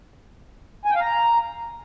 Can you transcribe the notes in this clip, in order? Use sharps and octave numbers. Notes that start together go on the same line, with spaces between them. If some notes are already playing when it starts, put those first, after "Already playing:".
G#5
G5
F5
A#5